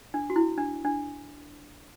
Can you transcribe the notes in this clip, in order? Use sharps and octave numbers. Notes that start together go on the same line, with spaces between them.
D4
F#4
E4
D4
D4